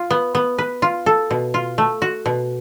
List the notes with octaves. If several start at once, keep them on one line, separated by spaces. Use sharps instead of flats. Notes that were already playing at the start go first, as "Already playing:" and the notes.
Already playing: F4
B3
B3
B4
F4
A4
B2
F4
A3
F#4
B2